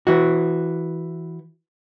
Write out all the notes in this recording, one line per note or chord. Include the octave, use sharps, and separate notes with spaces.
E3 F#4